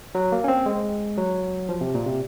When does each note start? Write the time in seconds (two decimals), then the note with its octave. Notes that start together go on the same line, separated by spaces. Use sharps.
0.15 F#3
0.32 A#3
0.44 C#4
0.48 C4
0.66 G#3
1.17 F#3
1.69 F3
1.81 C3
1.94 A#2
2.06 C3